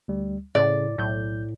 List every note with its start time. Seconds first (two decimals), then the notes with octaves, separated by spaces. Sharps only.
0.08 D2 G3
0.55 A2 C#3 D5
0.98 B1 A2 G6